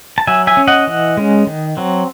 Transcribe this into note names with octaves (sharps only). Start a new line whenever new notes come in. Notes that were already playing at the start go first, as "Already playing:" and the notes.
A5
F#3 E5 G#5
E5 G#5
C#4
D#5 F#5
E3
G#3 C#4
D#3
F#3 C4